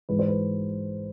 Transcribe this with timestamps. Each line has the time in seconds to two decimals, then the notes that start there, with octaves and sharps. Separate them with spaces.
0.09 G#2 E3 G#3 B4
0.19 C5
0.28 B4